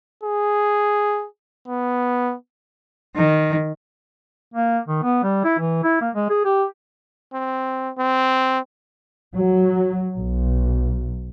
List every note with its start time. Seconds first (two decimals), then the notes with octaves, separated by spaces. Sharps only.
0.23 G#4
1.68 B3
3.16 D#3
4.54 A#3
4.88 D#3
5.03 B3
5.23 G3
5.44 E4
5.59 E3
5.83 E4
6.01 A#3
6.15 G#3
6.30 G#4
6.45 G4
7.33 C4
7.98 C4
9.35 F#3
10.16 B1